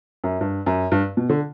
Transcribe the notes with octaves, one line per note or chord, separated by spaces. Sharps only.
F#2
G2
F#2
G2
B2
D3